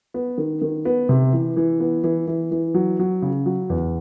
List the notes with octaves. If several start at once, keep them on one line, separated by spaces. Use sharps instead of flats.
B3
D#3
D#3
B3
C3
E3
E3
B3
E3
E3
E3
F#3
F#3
C#3
F#3
E2